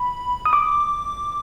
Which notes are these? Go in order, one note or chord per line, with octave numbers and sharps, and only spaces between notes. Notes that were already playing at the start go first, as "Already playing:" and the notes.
Already playing: B5
D#6
D6